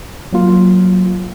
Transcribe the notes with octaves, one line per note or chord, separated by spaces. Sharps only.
F#3 A#3 F4